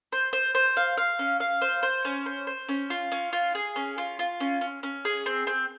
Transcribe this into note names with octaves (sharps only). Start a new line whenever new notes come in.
C5
C5
C5
F5
F5
C#4
F5
C5
C5
C#4
C5
C5
C#4
F4
C#4
F4
G#4
C#4
F4
F4
C#4
C#4
C#4
G#4
C4
C4